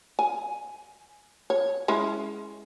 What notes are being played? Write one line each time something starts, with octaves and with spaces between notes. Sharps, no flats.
G#5
C#5
G#3 C#4 E4